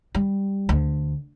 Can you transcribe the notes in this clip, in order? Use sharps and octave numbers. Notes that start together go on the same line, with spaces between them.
G3
D2